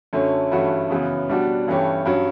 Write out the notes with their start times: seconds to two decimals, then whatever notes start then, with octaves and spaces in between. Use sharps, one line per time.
0.13 F#2 D3 A3 C#4
0.51 G2 E3 A3 C#4 F#4
0.90 F#2 C#3 E3 B3
1.29 B2 G3 D4 F#4
1.67 G2 E3 A3 C#4 G4
2.05 G2 F#3 C#4